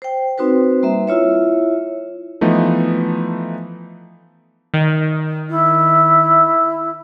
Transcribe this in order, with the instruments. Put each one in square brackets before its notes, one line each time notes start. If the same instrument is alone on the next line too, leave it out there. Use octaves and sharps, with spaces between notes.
[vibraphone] C5 G5
C4 D#4 F#4 B4 C5
G3 A#3 E5
E4 F4 C#5 E5
[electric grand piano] E3 F3 A3 B3 D#4
[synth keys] D#3
[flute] E4